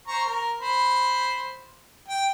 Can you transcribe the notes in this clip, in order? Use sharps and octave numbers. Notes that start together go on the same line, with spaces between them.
C5 A#5 C#6
A#4
C5 B5
G5